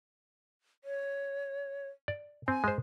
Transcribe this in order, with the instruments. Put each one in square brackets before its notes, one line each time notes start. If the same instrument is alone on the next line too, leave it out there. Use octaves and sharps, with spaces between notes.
[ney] C#5
[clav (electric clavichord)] D5
[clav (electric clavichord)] C4 [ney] G#5
[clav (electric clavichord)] G#3 C5